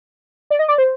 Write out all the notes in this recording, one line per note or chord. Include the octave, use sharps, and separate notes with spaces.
D5
D#5
D5
C5